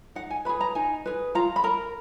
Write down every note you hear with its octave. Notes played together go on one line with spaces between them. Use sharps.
D#4 F#5
G#5
G#4 B4 B5
A#5
D#4 G#5
G#4 B4
F4 A#5
B5
A#4 A#5